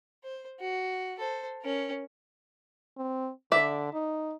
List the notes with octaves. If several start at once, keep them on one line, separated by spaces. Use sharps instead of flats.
C5
F#4
A4 C5
C#4 A#4
C4
D3 D5 E5
D#4